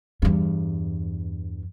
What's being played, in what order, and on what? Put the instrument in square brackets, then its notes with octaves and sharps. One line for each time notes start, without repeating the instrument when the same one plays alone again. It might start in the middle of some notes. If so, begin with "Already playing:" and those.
[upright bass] E2 G2